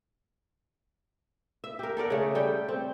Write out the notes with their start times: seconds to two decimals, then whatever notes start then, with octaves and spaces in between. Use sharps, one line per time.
1.64 E5
1.79 G4 A#4
1.97 A4 A#4 D5 F#5
2.10 C#3 A3
2.35 G3 A4 G5
2.69 C4